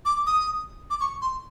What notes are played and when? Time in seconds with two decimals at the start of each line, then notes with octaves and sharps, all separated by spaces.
0.05 D6
0.27 D#6
0.90 D6
1.00 C#6
1.22 C6